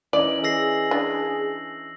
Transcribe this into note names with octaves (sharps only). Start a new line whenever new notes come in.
E3 C#4 D#4 D5 F#7
G#4 E6 A#6 C7
D4